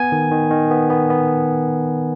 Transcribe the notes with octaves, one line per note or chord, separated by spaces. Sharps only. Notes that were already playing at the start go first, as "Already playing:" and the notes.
Already playing: B3 G#5
D#3
D#3
D#3
B3
B3
B3